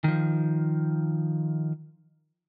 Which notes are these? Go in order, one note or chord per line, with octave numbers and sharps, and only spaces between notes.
D#3 F3